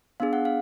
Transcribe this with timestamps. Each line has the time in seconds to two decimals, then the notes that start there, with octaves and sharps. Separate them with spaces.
0.20 B3 D4 G#4 F5
0.33 F#5
0.45 F5